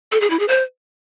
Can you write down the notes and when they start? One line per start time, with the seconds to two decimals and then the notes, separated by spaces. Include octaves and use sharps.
0.12 A4
0.21 G#4
0.30 E4
0.39 G#4
0.48 C5